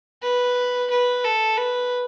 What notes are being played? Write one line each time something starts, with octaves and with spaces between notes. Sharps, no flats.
B4
B4
A4
B4